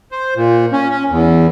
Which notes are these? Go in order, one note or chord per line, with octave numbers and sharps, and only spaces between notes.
C5
A#2
C#4
C#4
E2